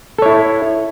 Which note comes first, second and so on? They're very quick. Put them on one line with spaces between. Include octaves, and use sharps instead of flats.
A4 C#5 E4